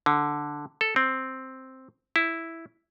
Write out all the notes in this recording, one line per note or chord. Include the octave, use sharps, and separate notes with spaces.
D3
A4
C4
E4